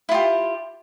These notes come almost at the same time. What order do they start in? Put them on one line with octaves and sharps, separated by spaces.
E4 F4 G4